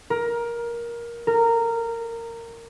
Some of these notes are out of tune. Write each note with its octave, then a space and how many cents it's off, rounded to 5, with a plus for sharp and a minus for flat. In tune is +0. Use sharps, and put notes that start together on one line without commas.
A#4 +15
A#4 -15